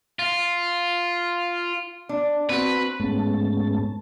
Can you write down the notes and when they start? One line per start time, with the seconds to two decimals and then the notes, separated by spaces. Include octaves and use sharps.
0.19 F4
2.09 D4
2.49 C4 F#4 B4
3.00 G#2 G#3 A3 B3 C#4 A5